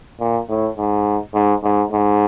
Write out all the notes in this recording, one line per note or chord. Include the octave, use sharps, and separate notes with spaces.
A#2
A2
G#2
G#2
G#2
G#2